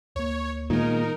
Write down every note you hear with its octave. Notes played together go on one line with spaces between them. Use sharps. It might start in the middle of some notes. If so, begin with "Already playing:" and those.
D2 A#3 C#5
A#2 D#3 G#3 A3 B3 D#4 A#4